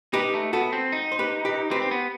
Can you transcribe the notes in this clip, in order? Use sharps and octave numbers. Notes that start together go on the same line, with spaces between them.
D#4 G4 B4
A3
B3 F#4 A4
C4
D#4
C5
G4 B4
G4 B4
C4 G4 B4
C4
B3